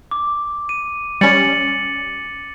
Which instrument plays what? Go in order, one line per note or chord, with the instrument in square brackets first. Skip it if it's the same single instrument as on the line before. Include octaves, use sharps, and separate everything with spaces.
[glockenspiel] D6
D#7
[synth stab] G3 C#4 [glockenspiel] A6 C#7 F#7